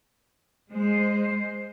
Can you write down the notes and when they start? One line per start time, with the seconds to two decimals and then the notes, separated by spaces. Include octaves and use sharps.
0.72 G#3 C5